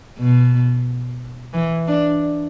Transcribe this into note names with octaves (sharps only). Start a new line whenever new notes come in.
B2
E3
D4